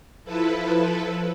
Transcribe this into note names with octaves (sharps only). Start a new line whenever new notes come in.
F3 E4 A4 B4